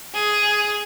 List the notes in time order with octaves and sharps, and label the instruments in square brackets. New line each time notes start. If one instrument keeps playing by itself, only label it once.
[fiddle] G#4